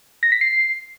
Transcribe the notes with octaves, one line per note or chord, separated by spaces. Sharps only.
A#6
B6
C7